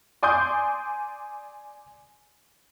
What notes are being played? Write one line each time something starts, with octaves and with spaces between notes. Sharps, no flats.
D5 G#5 C6 D6 D#6 G6